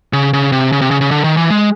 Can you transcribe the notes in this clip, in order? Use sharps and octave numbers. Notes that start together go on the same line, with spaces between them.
C#3
C#3
C3
C#3
C3
C#3
C#3
D3
D#3
E3
G#3